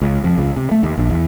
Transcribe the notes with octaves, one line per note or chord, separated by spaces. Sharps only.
C#2
F2
C#2
C3
A3
D#2
A#1
E2